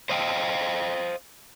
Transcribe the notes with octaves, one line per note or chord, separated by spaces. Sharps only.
C5 D#5 F5 G5